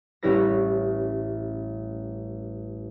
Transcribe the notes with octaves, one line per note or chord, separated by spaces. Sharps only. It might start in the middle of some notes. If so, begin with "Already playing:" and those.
A1 G3 C#4 E4 B4 A#6